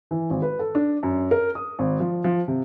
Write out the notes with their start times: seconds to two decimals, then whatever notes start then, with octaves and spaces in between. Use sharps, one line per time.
0.11 E3
0.30 G#1
0.42 B4
0.59 A4
0.75 D4
1.03 F#2
1.31 A#4
1.55 D#6
1.79 G#1
2.00 F3
2.24 F3
2.48 C3